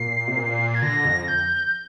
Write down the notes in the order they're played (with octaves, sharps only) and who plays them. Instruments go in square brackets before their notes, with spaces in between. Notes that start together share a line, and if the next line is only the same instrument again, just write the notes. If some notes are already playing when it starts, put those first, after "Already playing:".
Already playing: [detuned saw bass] A#2 [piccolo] C7
[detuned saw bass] C3
A#2
[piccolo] G#6
[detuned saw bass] D3 [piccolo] A#6
[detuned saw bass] F2
[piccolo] G6